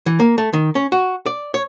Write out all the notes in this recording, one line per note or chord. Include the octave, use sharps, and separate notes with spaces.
E3
A#3
A3
D#3
C#4
F#4
D5
C#5